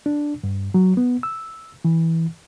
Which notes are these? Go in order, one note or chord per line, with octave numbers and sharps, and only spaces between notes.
D4
G2
F#3
B3
E6
E3